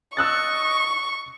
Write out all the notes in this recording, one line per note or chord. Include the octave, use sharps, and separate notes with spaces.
D#5 C#6 E6 F#6 A6